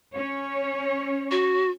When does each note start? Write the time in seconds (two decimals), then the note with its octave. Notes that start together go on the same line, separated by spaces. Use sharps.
0.15 C#4 C#5
1.31 F#4